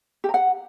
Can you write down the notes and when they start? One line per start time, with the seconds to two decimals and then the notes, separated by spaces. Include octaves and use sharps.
0.24 G4
0.29 A#5
0.34 F#5